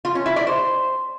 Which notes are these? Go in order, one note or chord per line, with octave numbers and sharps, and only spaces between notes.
F4
C#4
E4
D5
C5